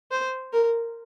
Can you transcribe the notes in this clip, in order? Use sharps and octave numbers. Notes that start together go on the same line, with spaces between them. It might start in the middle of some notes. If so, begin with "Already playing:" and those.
C5
A#4